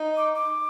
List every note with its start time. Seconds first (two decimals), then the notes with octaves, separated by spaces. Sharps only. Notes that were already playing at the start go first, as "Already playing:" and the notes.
Already playing: D#4
0.17 D6
0.34 D6